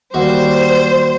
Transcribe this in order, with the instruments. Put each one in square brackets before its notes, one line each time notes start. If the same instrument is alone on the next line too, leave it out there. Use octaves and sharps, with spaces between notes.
[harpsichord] D#2 F#4 [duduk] G3 [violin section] C5